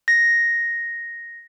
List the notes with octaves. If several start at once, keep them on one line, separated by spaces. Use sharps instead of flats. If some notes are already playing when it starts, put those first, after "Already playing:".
A#6